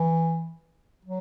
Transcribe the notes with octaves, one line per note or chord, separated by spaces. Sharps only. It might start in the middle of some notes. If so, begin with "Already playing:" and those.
Already playing: E3
F#3